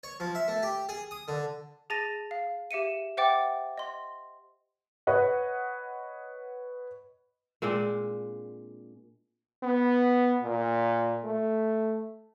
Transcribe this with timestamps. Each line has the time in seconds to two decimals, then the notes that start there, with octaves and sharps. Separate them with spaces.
0.03 C#5
0.20 F3
0.35 E5
0.48 A3
0.63 G4
0.89 G#4
1.11 D#6
1.28 D3
1.90 G#4 A5 A6 A#6 D#7
2.31 F5
2.71 G4 E5 C#7 D#7
3.17 C5 E5 F#5 G5 D6 A6
3.78 D#5 C6
5.07 B4 C#5 D#5 F#5
7.62 A#2 G#3 C4 D4
9.63 B3
10.42 A#2
11.24 A3